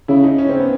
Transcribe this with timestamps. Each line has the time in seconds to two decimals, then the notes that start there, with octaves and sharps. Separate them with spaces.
0.08 C#3 E4
0.24 D#4
0.39 C#4
0.49 C4
0.60 B3